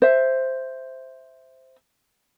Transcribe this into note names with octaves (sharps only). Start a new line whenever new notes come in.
C5 E5